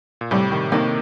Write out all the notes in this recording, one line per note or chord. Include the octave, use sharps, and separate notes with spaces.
A#2
A2 C3 G3
C3 D#3
C3 D#3 A#3 D#4